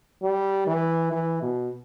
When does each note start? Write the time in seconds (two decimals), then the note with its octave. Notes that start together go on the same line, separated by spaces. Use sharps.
0.22 G3
0.67 E3
1.12 E3
1.42 B2